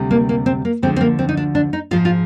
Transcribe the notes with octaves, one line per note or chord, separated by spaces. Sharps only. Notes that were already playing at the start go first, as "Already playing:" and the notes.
Already playing: D2 C3 G3
A#3
A#3
C4
A#3
D2 D3 F3 G#3 C4
C4
A#3
C4
D#4
D4
D4
D#4
G#2 F3 G#3 F4
F4